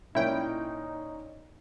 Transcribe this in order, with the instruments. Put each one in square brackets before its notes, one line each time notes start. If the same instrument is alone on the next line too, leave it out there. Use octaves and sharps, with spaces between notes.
[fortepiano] A#2 C#4 [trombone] D#4 [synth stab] E4 G5